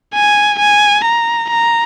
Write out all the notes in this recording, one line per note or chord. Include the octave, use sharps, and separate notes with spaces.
G#5
G#5
A#5
A#5